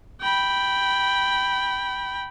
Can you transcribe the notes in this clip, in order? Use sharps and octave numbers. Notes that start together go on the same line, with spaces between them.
G5 B5